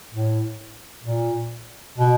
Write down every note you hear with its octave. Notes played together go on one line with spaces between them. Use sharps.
A2
A#2
B2